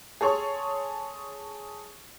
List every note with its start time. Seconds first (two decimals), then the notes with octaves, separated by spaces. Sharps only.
0.21 G#4 A4 C#5 C6 C#6